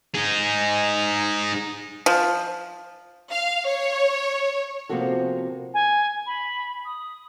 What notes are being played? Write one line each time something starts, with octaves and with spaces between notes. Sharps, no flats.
D#4 G#4
F3
F5
C#5
C3 F3 A#3 B3 F#4 A4
G#5
B5
D#6